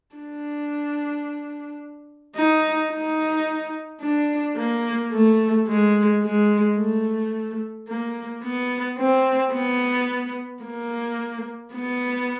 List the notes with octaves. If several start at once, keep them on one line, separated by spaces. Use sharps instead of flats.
D4
D#4
D#4
D4
A#3
A3
G#3
G#3
A3
A#3
B3
C4
B3
A#3
B3